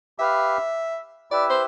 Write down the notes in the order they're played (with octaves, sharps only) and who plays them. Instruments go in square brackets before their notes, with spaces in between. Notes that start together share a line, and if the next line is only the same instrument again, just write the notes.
[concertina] G4 B4 F5 [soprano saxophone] E5
[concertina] E4 G4 B4 E5 [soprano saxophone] D5
[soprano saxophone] C5